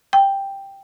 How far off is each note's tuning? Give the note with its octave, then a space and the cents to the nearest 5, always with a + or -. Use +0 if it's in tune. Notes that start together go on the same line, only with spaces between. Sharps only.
G5 +5